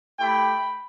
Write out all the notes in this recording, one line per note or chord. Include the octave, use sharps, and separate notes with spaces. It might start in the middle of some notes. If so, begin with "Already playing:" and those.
A3 E4 G4 G5 B5